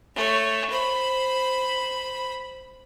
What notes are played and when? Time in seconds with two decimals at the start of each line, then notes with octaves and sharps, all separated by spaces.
0.15 A3 C#5
0.70 C5 B5